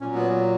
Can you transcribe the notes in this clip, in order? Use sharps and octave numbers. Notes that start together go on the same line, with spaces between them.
A#2 F#3 C#4
B3